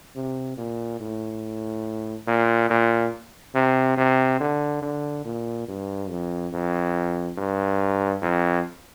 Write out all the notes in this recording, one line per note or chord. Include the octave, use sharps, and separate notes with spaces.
C3
A#2
A2
A#2
A#2
C3
C3
D3
D3
A#2
G2
F2
F2
G2
F2